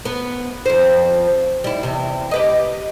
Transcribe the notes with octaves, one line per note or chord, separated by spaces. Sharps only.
B3 B4
F2 C5
G3 E4
E2 C3
G4 B4 D#5